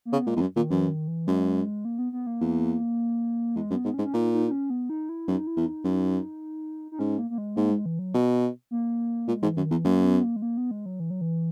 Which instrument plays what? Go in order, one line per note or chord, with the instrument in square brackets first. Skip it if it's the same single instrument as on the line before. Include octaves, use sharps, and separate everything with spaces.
[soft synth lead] A#3
[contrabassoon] C#3 [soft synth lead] B3
[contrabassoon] A#2 [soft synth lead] G#3
[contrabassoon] E2
F#2
[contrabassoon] A#2 [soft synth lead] D#3
[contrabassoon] F#2 [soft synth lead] E3
[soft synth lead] D#3
E3
[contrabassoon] F#2 [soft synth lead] G#3
[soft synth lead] A#3
B3
B3
A#3
[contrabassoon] E2
[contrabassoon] E2 [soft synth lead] G#3
[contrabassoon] F#2
[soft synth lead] B3
[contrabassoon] G#2
[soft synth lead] C#4
[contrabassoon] G#2
[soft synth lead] C#4
[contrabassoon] A#2 [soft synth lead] D#4
[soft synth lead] D#4
D#4
C#4
B3
D#4
E4
[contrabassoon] F#2 [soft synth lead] D#4
[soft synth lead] E4
[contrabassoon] E2
[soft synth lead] D#4
[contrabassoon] F#2
[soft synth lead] D#4
[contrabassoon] G#2 [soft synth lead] C#4
[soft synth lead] A#3
A#3
G#3
[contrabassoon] G#2 [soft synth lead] A#3
[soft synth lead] G#3
E3
F#3
[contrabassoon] B2
[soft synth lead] A#3
[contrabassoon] A#2 [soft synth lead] G#3
[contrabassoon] G#2 [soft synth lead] E3
[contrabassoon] F#2 [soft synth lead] D#3
[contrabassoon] E2 [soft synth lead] E3
[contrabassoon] F#2 [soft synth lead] A#3
[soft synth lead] B3
A#3
G#3
A#3
B3
G#3
F#3
E3
F#3
E3